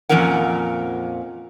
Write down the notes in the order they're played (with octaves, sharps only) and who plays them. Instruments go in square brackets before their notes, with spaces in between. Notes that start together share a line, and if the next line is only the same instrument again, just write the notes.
[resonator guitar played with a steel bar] F2 A#2 F3 C#4 A#4 F#5